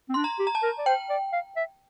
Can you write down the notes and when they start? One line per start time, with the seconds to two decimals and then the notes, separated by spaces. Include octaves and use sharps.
0.09 C4
0.14 D4 C6
0.24 A#5
0.39 G4
0.47 A#5
0.55 A5
0.63 A#4
0.79 D5
0.86 C5 G5
1.10 D5
1.32 F5
1.56 E5